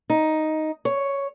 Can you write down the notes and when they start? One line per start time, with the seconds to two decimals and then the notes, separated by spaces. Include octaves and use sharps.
0.10 D#4
0.85 C#5